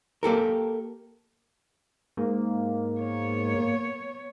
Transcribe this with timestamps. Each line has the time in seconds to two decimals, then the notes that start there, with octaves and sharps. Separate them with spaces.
0.23 A#3 G4 A4 A#4
2.17 G#2 A#3
3.01 B3 C#5